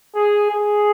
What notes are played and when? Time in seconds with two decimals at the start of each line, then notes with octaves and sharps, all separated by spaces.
0.15 G#4
0.51 G#4